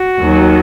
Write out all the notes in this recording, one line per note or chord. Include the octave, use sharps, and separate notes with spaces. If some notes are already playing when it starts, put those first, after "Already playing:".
Already playing: F#4
D#2 D#3 F#3